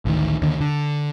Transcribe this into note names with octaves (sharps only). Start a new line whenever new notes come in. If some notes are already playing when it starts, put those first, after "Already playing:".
A1 D2 D#3
D#2 D3
D3